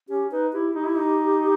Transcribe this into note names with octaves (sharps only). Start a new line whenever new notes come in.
C#4 G4
D#4 B4
E4 G4
D#4 G4
E4
D#4